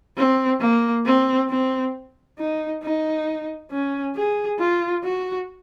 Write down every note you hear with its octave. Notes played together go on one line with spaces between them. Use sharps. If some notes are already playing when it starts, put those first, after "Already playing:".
C4
A#3
C4
C4
D#4
D#4
C#4
G#4
F4
F#4